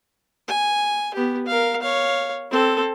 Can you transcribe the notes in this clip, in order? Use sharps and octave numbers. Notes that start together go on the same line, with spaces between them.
G#5
B3 G4
A#4 F5
C#5 F5
C4 A4